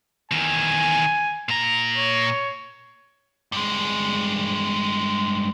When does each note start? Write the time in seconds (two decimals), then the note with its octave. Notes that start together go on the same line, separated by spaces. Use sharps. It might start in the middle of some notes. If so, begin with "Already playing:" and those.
0.32 E2 D#3 G#5
1.49 A#2 A#5
1.97 C#5
3.52 G2 G#3